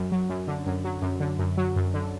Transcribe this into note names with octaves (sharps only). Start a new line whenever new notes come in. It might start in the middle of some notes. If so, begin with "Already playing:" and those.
Already playing: F#2
F#3
F#2
D3
F#2
F#3
F#2
D3
F#2
F#3
F#2
D3